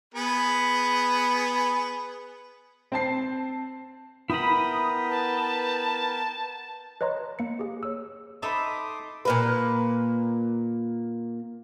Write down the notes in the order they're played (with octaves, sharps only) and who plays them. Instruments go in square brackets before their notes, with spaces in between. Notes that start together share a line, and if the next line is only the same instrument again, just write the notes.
[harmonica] B3 G#4 B4
[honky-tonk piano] C4 A5 C7
[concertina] B3 A#4 G5 [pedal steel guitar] E4 B5 [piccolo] D#6
[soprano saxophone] B4 [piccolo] A5
[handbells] B4 C#5 D#5 A#5 C6 F#6
A#3 C#7
G4 G#4
C#5 E6
[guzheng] D#4 A4 E5 [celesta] D#5 B5 [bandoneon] C6 D6 D#6
[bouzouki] A#2 A#3 B4